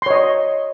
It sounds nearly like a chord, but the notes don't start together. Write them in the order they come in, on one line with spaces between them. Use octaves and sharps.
C6 C#5 D#5